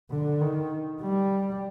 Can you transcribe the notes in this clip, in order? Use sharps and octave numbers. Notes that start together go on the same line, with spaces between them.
D3
D#3
G3